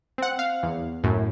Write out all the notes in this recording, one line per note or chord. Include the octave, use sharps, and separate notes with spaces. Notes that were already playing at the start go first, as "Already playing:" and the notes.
C4 F#5
F5
E2
F#2 A2